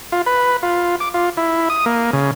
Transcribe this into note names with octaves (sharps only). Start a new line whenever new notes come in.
F4
B4
F4
D6
F4
E4
D#6
A#3
C#3